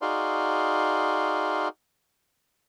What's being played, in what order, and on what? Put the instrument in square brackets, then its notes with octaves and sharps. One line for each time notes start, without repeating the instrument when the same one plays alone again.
[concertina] D#4 F#4 G#4 D5 F5 C6